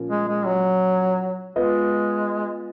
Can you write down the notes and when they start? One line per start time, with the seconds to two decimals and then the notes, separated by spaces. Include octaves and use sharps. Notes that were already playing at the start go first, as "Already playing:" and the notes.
Already playing: A#2 F3 A#3 C#4 F4
0.10 G#3
0.28 G#3
0.46 F#3
1.55 G#3 B3 F4 B4 D#5